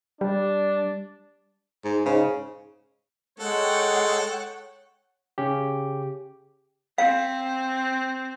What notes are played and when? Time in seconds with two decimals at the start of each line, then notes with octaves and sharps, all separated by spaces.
0.21 G3 D4
1.85 G#2
2.06 G#2 C#3
3.40 G#3 A4 C#5 F#5 G5
5.38 C#3 C#4 G4
6.98 C4 F5